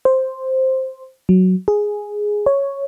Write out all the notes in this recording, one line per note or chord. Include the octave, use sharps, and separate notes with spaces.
C5
F#3
G#4
C#5